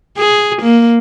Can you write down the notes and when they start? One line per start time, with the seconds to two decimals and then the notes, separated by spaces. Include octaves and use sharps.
0.17 G#4
0.62 A#3